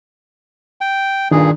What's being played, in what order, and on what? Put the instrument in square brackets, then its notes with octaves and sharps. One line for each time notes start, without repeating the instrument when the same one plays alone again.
[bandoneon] G5
[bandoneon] G2 A#2 G#4 [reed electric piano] D#3 D4